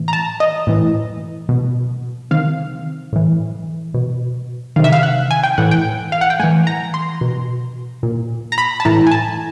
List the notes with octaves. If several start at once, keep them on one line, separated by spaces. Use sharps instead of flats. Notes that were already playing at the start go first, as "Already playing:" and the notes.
Already playing: A2 E3
A#5
A5
D#5
A2 E3
B2
C3 D#3 F5
A2 E3
B2
C3 D#3 F5
E5
F5
F#5
G#5
G5
A2 E3 F#5
G5
F5
F#5
G5
A2 E3 G#5
A#5
C6
B2
A#2
A#5
B5
A5
A2 E3 A#5
G#5
A5